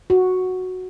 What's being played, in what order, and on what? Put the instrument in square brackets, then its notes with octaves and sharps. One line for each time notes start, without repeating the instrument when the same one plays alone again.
[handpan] F#4